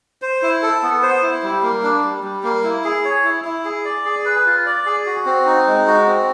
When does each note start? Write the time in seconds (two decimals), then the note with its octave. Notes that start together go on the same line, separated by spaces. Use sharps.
0.22 C5
0.42 E4
0.62 A4
0.83 B3
1.03 C5
1.23 E4
1.43 G3
1.63 A#3
1.83 D4
2.04 G3
2.24 G3
2.43 A#3
2.64 E4
2.84 G#4
3.05 C#5
3.24 E4
3.45 E4
3.65 G#4
3.85 D5
4.05 G#4
4.25 B4
4.46 F4
4.66 D5
4.86 G#4
5.06 F#4
5.26 C4
5.46 D#4
5.67 G#3
5.87 F#4
6.07 C4